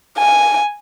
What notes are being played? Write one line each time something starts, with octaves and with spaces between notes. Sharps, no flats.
G#5